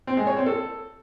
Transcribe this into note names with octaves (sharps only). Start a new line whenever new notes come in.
C4
G#3
C#5
C4
A4